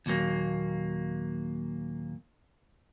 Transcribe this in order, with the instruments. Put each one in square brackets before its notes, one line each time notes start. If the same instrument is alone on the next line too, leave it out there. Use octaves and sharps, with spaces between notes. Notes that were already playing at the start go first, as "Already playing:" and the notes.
[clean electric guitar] D#2 A#2 F#3 A#3